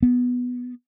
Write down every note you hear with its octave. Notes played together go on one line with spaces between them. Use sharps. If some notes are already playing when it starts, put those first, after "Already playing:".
B3